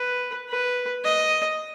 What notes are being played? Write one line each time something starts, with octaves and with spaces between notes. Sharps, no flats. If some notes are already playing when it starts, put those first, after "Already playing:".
Already playing: B4
B4
D#5